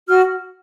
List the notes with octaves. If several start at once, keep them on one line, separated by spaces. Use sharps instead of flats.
F#4 F6